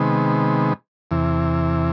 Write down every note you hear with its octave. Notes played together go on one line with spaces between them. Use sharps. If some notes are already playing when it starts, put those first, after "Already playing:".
Already playing: C3 D#3 G#3 B3
E2 C3 E3